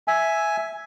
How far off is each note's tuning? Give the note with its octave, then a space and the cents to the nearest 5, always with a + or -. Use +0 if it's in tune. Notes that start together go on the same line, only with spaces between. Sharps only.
E5 +0 G#5 +5